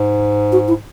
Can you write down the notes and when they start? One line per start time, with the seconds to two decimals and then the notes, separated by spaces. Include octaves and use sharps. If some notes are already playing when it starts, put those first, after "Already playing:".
Already playing: G#2
0.52 F#4
0.68 E4